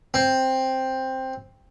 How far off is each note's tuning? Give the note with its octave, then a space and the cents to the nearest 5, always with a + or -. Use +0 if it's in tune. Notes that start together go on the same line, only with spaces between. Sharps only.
C4 +5